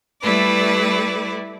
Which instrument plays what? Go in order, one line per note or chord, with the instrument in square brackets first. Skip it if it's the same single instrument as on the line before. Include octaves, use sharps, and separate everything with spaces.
[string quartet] G3 A3 E4 B4 D5